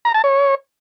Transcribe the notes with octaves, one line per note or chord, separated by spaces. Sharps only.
A#5
A5
C#5